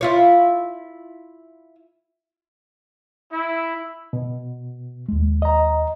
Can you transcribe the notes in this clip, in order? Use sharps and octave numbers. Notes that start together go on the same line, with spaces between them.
E4 F4 C#5
E4
B2
D#2 G#3
D#5 A#5